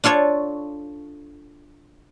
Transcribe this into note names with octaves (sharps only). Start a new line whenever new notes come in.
D4 F4 A4 C#5